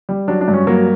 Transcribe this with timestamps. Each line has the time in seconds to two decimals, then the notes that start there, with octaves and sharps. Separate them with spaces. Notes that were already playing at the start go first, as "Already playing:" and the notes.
0.09 G3
0.28 F#3 D4
0.41 D4
0.48 G2
0.54 C#4
0.67 F#3 A#3